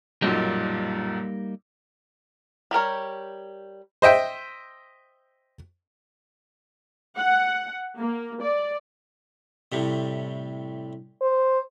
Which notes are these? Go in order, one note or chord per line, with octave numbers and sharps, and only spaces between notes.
B1 F#2 A#2 G3 A#3 D#4
G3 G4 A#4 C#5
C5 D#5 E5 G5
F#5
A#3
D5
A2 C3 G3
C5